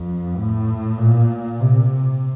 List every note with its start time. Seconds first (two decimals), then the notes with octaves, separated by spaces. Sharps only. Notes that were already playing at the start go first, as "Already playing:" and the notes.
Already playing: F2
0.37 A2
0.98 A#2
1.60 C3